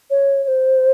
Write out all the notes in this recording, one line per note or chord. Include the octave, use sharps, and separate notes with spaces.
C#5
C#5
C5